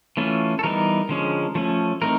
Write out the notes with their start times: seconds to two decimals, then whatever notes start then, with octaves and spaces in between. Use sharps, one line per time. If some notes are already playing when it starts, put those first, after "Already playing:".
0.17 E3 A3 C#4 F4
0.59 A4
0.63 E3 G3 B3 D#4 A#4
1.09 D3 F3 G#3 C#4
1.55 F3 A3 C#4
2.01 E3 A3 C4 D#4 A#4